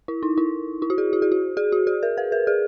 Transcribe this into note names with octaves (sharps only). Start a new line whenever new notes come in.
E4
D#4
E4
E4
F#4
G#4
F#4
G#4
F#4
G#4
F#4
G#4
A#4
B4
A#4
G#4